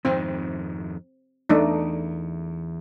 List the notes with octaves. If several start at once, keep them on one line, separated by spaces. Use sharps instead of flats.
F2 G#2 D#3 C4
E2 A3 D4 D#4